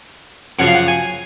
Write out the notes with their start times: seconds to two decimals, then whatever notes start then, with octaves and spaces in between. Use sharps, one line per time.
0.59 F#2 C#3 F3 F#5
0.67 F5
0.74 F#5
0.88 G#5